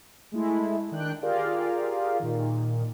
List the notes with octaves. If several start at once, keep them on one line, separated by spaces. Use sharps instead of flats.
G#3 A3 E4
D#3 D4 G5 F#6
F4 G4 G#4 A#4 D5 F5
A#2 D#3